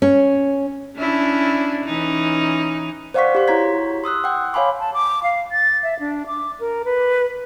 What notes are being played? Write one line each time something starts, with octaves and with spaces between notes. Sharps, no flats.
C#4
C#4 D4 E4
E3 C#4 D#4
C5 D5 F5 F#5 C#6 B6
G4 C6
E4 F#4 C#5 A#5 G#6 B6
C6 D#6 E6 F#6
F#5 G5
C#5 F5 G#5 B5 C6 D6
A5
D6
F5
A6
E5
D4
D6
A#4
B4